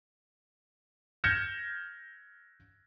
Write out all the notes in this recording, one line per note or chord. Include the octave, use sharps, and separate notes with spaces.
F6 G6 G#6 A#6 C#7 E7